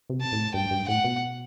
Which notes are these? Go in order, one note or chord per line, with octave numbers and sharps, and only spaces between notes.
C3
A5
A2
G2 G5
G2
A2 F#5
B2